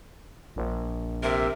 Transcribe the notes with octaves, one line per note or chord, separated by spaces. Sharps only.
A#1
C3 A#4 E5